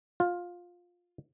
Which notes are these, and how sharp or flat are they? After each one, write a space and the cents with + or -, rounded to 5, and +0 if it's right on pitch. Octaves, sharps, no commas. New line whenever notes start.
F4 +10